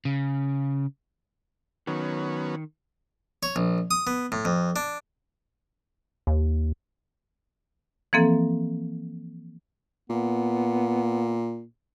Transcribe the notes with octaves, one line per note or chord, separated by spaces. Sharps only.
C#3
D#3 F#3 B3 C#4
C#5
A#1
D#6
B3
A2
F2
D4
D#2
E3 F3 A#3 C4 A4
A#2 B3